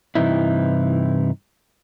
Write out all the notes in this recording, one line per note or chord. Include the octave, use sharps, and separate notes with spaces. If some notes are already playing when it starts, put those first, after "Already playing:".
G2 C3 E3 D#4 E4